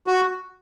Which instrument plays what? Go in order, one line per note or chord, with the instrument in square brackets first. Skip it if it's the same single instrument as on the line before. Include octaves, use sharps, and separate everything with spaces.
[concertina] F#4